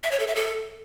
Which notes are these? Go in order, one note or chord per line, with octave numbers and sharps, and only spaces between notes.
E5
C#5
A4
E5
A4